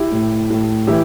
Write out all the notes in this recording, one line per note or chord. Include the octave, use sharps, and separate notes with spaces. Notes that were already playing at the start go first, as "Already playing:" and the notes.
Already playing: E4 G4
A2
A2
E3 E4 G4